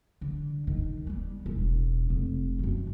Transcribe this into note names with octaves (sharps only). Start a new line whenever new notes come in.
D3
D#3
G3 B3
E1
F1
F#2 D#3